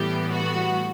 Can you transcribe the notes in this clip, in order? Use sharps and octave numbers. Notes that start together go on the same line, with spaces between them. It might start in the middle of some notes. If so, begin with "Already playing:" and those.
Already playing: A2 E3 G3 B3 G4
F#4